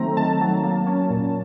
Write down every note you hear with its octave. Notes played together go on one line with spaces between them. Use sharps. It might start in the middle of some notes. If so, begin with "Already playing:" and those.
Already playing: D#3 F#3 A3 C4 A#5
D#3 A5
F#3
A#3
C#4
A#2